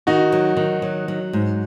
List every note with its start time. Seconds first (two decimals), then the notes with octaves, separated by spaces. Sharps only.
0.07 D#3 D#4 F#4
0.32 F#3
0.57 D#3
0.82 F#3
1.08 F#3
1.33 G#2